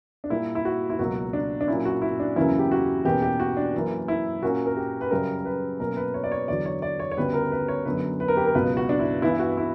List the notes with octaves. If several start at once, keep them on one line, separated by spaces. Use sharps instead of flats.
D4
A#2 G3 A#3 E4
E4
F#4
E4
C#2 B2 F#3 A#3 F#4
D4
D4
A#2 F#3 C#4 E4
F#4
E4
D4
E2 C#3 F#3 A#3 C#4 E4
G4
F#4
E2 B2 A#3 C#4 G4
G4
F#4
D4
F#2 E3 A#3
E4
A#2 A#3 C#4 F#4
A#4
G4
B4
F#2 C#3 G3 A#4
B4
B2 F#3 A#3 C#4 A#4
B4
C#5
D5
C#5
E2 D3 F#3 D5
C#5
D5
C#5
C#5
D2 C#3 G3 B3 B4
A#4
B4
C#5
F#2 D3 F#3 B3 B4
B4
A#4
G4
A#4
C#2 B2 F#3 B3 B4
F#4
D4
E4
G2 E3 B3 E4
F#4
E4